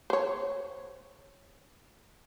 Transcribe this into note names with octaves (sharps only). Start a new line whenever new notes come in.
C5 C#5